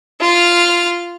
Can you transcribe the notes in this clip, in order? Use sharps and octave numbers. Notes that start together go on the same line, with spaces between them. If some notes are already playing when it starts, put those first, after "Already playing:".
F4 F6